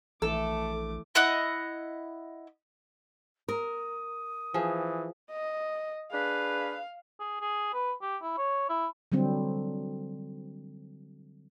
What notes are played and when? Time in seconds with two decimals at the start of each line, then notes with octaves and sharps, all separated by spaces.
0.22 A#1 E3 A3 A4 D6
1.15 E4 D#5 F#5 D#6
3.48 A#4 D#6
4.54 E3 F3 G#4
5.31 D#5
6.12 D4 G#4 B4 F5
7.20 G#4
7.41 G#4
7.73 B4
8.01 G4
8.22 E4
8.38 C#5
8.69 E4
9.12 D3 F#3 G3 C4